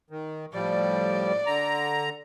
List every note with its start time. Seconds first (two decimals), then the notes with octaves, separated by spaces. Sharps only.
0.10 D#3
0.53 A2 F3 G3 D5
1.46 D3 A#5